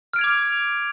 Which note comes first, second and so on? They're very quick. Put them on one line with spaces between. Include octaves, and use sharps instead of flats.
F6 D7 G#6 F7 D6